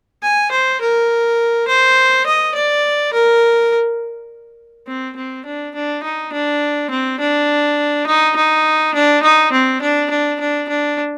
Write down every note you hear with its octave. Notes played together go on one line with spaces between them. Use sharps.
G#5
C5
A#4
C5
D#5
D5
A#4
C4
C4
D4
D4
D#4
D4
C4
D4
D#4
D#4
D4
D#4
C4
D4
D4
D4
D4